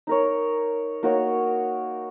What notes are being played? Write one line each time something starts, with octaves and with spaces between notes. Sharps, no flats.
D#4 A#4 C#5
A#3 D#4 F#4 C#5